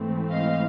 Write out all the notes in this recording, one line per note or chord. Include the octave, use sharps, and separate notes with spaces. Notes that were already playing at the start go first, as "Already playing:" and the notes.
Already playing: G#2 E3 A3 C4
D#5 F5